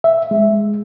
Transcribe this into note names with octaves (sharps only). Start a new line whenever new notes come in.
E5
G#3